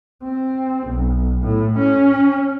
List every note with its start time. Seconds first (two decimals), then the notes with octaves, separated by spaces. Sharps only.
0.23 C4
0.87 B1
1.41 A2
1.78 C#4